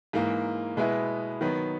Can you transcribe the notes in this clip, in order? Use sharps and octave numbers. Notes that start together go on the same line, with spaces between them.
G#2 E3 A#3
B2 G#3 B3 E4
D#3 F#3 B3